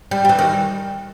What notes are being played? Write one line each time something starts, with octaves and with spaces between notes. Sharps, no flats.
G3
G3
E3
D#3